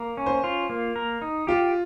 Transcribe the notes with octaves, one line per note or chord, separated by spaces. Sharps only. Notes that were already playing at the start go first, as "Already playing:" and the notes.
Already playing: A#3
C#4
C5
F4
A#3
A#4
D#4
F4 G4